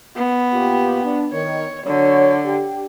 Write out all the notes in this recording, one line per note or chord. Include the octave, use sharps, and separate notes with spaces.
B3
A#2 F4 G4
D4
D#3 C#5
D3 F#3 C#5
G4